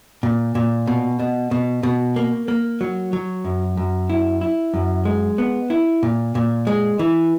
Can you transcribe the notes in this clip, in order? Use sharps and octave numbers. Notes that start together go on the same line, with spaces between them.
A#2
A#2
B2
B2
B2
B2
A#3
A#3
F#3
F#3
F#2
F#2
E4
E4
F#2
G#3
B3
E4
A#2
A#2
G#3
E3